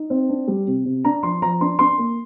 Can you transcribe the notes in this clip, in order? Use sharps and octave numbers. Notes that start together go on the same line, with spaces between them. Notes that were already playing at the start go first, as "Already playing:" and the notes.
Already playing: D#4
C4
D4
G3
C3
C3
D4 A#5
F3 C6
F3 A#5
D4 C6
D4 C6
A#3